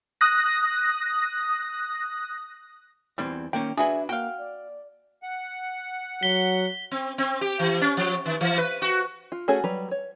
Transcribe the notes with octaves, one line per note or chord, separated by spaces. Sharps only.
D#6 F#6 A#6
E2 E3 G3 C4
D#3 A#3 C#4 G5
D4 F#4 G#4 B4 E5 G#5
A#3 F#4 F5 G5
D5
F#5
F#3 B6 G7
C4
C4
G4
E3
C#4
F3
D#3
E3
B4
F#4
F4
A3 C#4 F#4 G#4 C#5
F#3 G3 B4 A#5
C#5